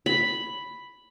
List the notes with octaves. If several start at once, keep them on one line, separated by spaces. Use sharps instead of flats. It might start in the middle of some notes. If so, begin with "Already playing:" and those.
B5